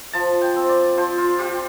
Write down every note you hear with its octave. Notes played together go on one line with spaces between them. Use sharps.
F3 A5
G5
C4
D5
F3 C5
F4
F4 G4